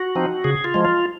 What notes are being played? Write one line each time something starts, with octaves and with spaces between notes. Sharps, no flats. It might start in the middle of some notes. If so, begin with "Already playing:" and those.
Already playing: F#4
F3 C4 D#4
C#3 G#4
F4
F3 G#3
F4